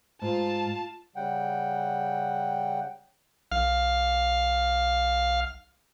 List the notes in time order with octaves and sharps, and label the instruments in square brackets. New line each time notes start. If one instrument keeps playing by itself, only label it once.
[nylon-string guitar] G#2 [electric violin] F4 A5
[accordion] C#3 G3 F#5 G5
[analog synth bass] B1 [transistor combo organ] F5